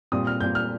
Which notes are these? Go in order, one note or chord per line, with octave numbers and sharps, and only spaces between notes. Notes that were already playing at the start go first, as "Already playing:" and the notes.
A#2 G3 C4 D#6
F6
A#2 G3 C4 G6
F6